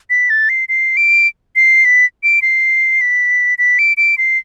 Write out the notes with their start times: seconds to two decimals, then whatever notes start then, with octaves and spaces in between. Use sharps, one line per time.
0.10 B6
0.30 A6
0.49 C7
0.69 C7
0.97 D7
1.56 C7
1.85 B6
2.23 D7
2.42 C7
3.01 B6
3.58 B6
3.79 D7
3.97 D7
4.18 C7